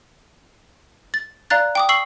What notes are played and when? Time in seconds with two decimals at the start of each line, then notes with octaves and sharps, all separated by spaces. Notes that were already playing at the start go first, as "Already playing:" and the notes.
1.14 A6
1.50 D5 F5 A#5 F#6 A6
1.75 G5 D6 D#6
1.89 C#6 E6 C7 F#7